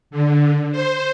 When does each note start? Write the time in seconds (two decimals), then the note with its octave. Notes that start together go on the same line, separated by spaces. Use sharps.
0.11 D3
0.71 C5